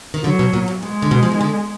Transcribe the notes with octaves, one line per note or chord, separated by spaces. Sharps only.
D#3
D3 F#3
B2
A#2
A#2
B2 G#3
D3
B2
F3
D#3
D3